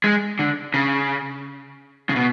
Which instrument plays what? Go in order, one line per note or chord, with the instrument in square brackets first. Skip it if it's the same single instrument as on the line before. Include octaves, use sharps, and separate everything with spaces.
[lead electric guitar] G#3
D3
C#3
C#3
B2